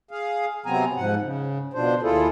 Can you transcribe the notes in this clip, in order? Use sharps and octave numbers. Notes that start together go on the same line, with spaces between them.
G#4 F5
C3 F#3 B3 C4 G#5 A#5
G#2 F3 F#5
C#3
B2 F3 D4 C5
D#2 E4 F4 G#4 A4